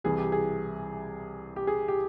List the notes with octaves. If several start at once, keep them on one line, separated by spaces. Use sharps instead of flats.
C2 C3 E3 G#4
G4
G#4
G4
G#4
G4